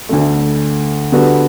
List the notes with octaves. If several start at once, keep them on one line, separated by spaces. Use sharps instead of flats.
D2 D3 A3
D3 G3 B3 F#4 A4